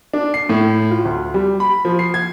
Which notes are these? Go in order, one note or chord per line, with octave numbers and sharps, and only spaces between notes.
D4
C7
A2
F4
D2
G3
B5
F3
C7
G#6